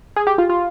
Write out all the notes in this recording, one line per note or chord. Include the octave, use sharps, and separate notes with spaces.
G#4
G4
F4
F4